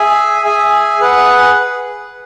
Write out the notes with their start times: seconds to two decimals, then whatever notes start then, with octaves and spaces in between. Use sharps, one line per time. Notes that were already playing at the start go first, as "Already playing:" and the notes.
Already playing: G#4 E5 G#5
0.44 G#4 E5 G#5
0.99 G#4 B4 F#5